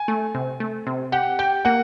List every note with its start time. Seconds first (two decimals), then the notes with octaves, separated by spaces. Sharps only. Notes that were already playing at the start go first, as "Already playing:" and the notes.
Already playing: G#5
0.08 A3
0.35 C3
0.60 A3
0.87 C3
1.12 G4 F#5
1.39 G4 G5
1.65 A#3 F#5